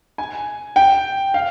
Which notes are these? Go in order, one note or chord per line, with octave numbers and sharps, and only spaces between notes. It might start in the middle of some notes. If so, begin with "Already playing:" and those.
G#5
G5
F5